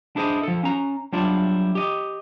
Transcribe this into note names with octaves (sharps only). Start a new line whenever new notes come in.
D4 E4 G#4 C5 D#5
F3 A4
C#4 A#5
F#3 G3 D4 E4 F4
G4 D#5